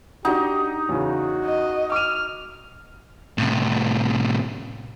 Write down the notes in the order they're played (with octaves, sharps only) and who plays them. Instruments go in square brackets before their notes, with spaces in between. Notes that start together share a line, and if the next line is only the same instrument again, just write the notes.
[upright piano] D4 F#4 F#5 [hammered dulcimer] D#4 [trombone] G4
[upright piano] E2 C#3 [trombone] F#4
[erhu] D#5
[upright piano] D6 D#7 [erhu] F6
[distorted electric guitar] A2 C3